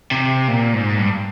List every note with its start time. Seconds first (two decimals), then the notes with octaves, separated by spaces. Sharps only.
0.11 C3
0.48 A#2
0.74 G#2
0.98 G2